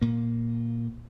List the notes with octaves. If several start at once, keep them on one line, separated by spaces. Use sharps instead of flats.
A#2 A#3